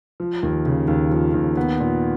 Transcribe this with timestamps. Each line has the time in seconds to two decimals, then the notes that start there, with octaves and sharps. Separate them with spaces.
0.20 F3
0.43 D#2
0.66 C#3
0.88 D#2
1.11 F3
1.34 D#2
1.57 B3
1.80 A#2